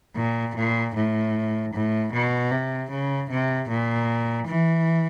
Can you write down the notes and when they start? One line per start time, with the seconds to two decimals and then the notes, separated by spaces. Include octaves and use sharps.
0.16 A#2
0.56 A#2
0.95 A2
1.74 A2
2.13 B2
2.51 C3
2.91 C#3
3.30 C3
3.69 A#2
4.48 E3